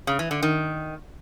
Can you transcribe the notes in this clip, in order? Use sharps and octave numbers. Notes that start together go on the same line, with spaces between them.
C#3
E3
D3
D#3